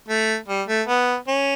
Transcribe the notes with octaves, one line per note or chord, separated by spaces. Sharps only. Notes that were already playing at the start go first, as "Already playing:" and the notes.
A3
G3
A3
B3
C#4